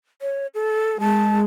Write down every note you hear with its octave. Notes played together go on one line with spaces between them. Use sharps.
C#5
A4
G#3 A5